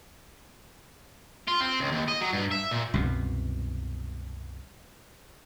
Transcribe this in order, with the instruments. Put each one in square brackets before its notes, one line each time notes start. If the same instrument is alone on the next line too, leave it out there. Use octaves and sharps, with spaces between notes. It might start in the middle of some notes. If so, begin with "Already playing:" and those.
[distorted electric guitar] F4
C4
C#2
D#2
D#5
F#3
G2
E5
A#2
[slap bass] C2 F#2 B2